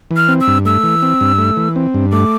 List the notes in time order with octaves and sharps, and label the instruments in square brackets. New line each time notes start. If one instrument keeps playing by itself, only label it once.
[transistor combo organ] E3
[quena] F6
[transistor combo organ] C4
[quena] E6
[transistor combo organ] G2
[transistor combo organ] A3 [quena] E6
[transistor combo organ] E3
C4
G2
A3
E3
C4
G2
[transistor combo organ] A3 [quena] D6